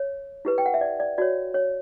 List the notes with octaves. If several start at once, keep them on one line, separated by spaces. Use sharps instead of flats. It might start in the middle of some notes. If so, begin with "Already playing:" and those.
Already playing: C#5
E4 G4 B4
G5
F#5
E5
D5
D5
F#4 C#5 D5
C#5